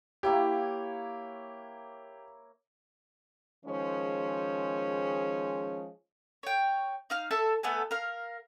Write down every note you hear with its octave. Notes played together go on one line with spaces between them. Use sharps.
A#3 E4 G4 C#5
D#3 F3 G#3 C#4 G#4 C5
C#5 G5
D#4 F5 F6
A4 E5 A5
A3 B3 A4 G#5
A#4 F5